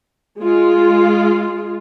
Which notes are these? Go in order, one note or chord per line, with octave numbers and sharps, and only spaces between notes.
G#3 F4